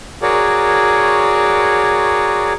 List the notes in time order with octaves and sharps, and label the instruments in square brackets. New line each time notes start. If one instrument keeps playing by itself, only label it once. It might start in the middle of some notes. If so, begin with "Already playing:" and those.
[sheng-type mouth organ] F#4 G#4 A#4 C#5 D5